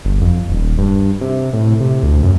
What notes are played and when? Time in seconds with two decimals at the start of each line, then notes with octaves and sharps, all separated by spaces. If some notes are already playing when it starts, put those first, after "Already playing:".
0.05 G1
0.21 F2
0.49 D#1
0.78 G2
1.21 C3
1.53 A2
1.80 C3
2.03 D2
2.23 F#2